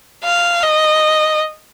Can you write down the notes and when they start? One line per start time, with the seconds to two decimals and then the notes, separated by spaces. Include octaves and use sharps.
0.25 F5
0.63 D#5